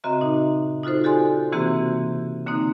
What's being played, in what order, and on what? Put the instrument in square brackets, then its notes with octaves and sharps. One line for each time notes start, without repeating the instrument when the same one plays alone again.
[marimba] C#3 C4 F#4 D#5 E5 A#5
A#2 D#4
D#4 F4 F#4 A4 C5
F#4 G4 A4 D5 G#5 C6
C3 E3 A#3 C4 F#4 G4
D3 A#3 C4 D#4